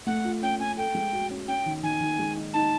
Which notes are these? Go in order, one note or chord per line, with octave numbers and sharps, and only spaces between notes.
A3 F#5
F4
C#4 G5
C#4 G#5
A4 G5
G#3
F#4
C#4
C#4 G5
D#3
D#3 G#5
D#3
G#3
D#4
D#4 A5